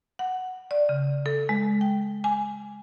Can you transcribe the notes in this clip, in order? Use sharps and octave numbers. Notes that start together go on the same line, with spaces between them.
F#5
D5
C#3
A4
G#3
G5
G#5